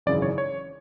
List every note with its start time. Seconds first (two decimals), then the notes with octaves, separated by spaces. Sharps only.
0.06 G#1 F#2 C#3 E3 D5
0.22 C#5
0.38 C#5